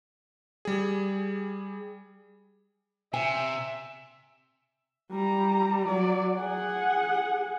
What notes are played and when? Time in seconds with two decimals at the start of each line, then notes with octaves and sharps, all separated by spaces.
0.65 G3 G#4
3.14 C3 E5 G#5
5.12 G3 A#5
5.86 F#3 D5
6.37 G#4 F#5